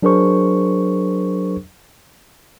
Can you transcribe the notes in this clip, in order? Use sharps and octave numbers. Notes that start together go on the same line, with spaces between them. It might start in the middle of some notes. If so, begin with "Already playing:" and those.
F#3 D4 G#4 A#4 C5 C#6